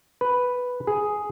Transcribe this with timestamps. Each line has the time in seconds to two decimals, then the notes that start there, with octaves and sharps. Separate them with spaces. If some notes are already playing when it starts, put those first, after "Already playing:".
0.21 B4
0.87 G#4